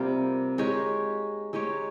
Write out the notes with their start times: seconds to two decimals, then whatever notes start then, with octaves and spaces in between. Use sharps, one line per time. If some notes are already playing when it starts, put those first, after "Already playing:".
Already playing: C3 G3 A#3 F4
0.58 G#3 D#4 G4 C#5
1.53 G#3 D#4 G4 C#5